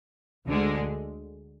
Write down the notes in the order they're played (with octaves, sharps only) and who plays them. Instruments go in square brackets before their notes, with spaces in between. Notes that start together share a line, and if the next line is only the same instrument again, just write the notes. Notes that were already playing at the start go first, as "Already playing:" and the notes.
[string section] D2 D3 G#3